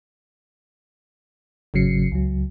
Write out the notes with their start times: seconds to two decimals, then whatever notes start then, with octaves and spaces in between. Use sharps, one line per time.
1.74 G#1 C#3 F#3 C7 C#7
2.12 C#2 F#3